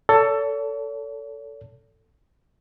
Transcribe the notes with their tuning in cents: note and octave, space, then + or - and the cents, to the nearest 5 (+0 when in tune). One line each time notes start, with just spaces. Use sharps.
A4 +15 C#5 +45